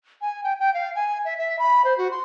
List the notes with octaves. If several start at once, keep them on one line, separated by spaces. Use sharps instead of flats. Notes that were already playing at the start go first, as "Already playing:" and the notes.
G#5
G5
G5
F5
G#5
E5
E5
B5
C5
F#4
C6